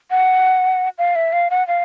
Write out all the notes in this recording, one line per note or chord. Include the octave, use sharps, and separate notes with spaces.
F#5
F5
E5
F5
F#5
F5